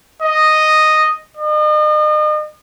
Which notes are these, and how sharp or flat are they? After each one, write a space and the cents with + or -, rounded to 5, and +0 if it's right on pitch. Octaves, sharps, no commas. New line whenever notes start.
D#5 -5
D#5 -40